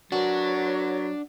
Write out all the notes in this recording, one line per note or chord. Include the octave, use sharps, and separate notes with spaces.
F#3 D4 F#4 A#4 B4 C#5